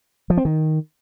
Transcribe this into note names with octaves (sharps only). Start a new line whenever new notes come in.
F3
C4
D#3